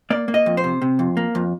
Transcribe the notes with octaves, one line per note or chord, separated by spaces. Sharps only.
A#3 D5
A#3
D#5
F2
C5
C3
C3
F2
A#3
F2